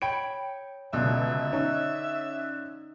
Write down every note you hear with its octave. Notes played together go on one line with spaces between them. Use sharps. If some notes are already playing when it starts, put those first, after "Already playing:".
C#5 G5 B5 D7
C#2 B2 D3 E5
C#4 D#4